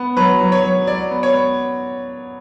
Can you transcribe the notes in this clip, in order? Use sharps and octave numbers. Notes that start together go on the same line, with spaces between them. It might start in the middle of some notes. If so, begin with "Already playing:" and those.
Already playing: B3
F#3 B4
F#3
C#5
F#3
F#3 D5
B3
C#5
B3